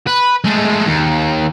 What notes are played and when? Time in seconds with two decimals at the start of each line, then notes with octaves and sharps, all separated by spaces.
0.07 B4
0.44 G#3 A3
0.87 D#2